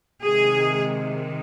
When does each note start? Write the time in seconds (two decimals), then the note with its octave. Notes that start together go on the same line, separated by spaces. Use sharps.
0.23 C3 D#3 G#3 G#4